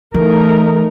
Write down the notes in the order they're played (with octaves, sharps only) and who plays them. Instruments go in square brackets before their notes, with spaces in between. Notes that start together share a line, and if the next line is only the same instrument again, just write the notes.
[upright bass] E3 [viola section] A3 D#4 A#4